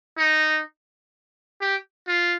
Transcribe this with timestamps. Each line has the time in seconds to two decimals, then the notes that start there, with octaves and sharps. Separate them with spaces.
0.18 D#4
1.61 G4
2.08 F4